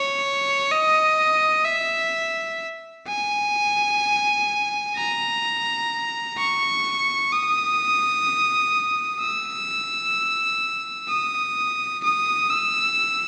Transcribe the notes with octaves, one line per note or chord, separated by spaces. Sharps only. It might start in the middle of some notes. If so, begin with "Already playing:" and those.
Already playing: C#5
D#5
E5
G#5
A#5
C#6
D#6
E6
D#6
D#6
E6